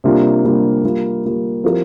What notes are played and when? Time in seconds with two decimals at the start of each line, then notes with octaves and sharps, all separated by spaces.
0.04 C3 G3 A#3 D4 F4
0.44 C3 G3 A#3 D4 F4
0.84 G3 A#3 F4
1.24 G3 A#3 F4
1.64 F3 C4 E4 G4 A#4